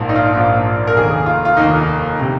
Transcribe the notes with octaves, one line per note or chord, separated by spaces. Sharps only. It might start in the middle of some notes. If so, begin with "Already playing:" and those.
Already playing: A#1 G#2 F3 A#3
D#4
F4
A#1 G#2 F3 A#3
A#4
F1 D#2 D#3 A#3 G#4
F4
F4
F1 D#2 D#3 A#3 D#4
C3